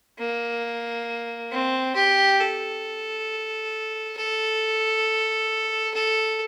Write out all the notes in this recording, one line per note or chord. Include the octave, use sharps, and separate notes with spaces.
A#3
C4
G4
A4
A4
A4